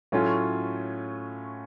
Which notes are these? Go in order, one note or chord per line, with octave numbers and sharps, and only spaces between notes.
A2 F#3 A3 C#4 F4